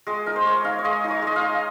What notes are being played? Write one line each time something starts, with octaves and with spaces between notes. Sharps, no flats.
G#3 G#4
D#4 A#4
C5
G#3 C#5
D#4 F5
C#5
G#3 D#5
D#4
C#5
G#3 D#5
F5
D#4